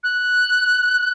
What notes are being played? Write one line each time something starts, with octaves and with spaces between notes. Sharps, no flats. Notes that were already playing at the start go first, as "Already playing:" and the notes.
F#6